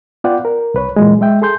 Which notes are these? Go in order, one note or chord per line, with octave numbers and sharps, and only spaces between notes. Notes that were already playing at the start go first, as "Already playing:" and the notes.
B3 F4 D5 F#5 G5
A#4
C2 B4 C#5
A#2 E3 F#3 G#3
G#3 E5 G5
G#4 A4 C6 G6